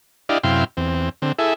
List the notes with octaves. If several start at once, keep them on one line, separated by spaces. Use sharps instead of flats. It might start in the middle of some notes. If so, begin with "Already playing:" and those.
D4 E4 G4 D5 D#5 F5
F#2 C3 E4 F5 G5 C6
E2 C4
D3 C4
E4 G#4 A4 E5